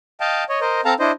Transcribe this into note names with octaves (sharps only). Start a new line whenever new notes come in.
D#5 F5 G5 A5
C#5 D#5
A#4 C5 D#5
C4 A4 F5 A5 A#5
D4 E4 C5 D#5